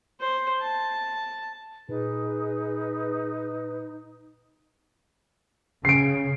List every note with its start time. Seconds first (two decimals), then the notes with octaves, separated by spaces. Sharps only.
0.20 C5
0.61 A5
1.89 A#2 D#4 G#4 B4
5.85 C#3 C7 D7